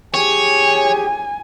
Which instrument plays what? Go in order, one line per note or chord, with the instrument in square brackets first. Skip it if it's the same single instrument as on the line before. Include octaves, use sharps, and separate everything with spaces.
[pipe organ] G4 G#4 [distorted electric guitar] C#5 [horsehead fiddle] G#5